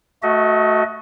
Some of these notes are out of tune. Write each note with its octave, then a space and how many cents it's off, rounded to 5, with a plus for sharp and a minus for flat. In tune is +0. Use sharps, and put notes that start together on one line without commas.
A3 +0 F#4 +0 D#5 +30